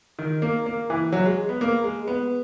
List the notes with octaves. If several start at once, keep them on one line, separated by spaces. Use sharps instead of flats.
D#3
A#3
A#3
E3
F#3
G#3
B3
A#3
G#3
B3